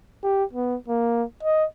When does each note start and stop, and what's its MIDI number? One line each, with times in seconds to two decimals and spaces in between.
0.23 0.44 67
0.53 0.77 59
0.88 1.24 58
1.43 1.65 75